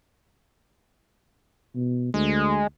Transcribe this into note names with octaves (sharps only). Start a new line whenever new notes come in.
B2
D2 G#3